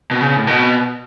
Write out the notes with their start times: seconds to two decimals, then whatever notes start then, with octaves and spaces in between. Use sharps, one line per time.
0.11 B2
0.21 C#3
0.36 A2
0.47 B2